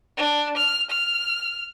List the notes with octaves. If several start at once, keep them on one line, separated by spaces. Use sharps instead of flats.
D4
F6
F6